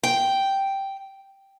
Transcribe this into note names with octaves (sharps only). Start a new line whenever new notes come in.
G5